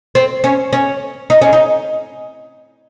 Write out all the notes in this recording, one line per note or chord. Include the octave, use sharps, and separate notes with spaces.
C4
C#4
C#4
D#4
C#4
D#4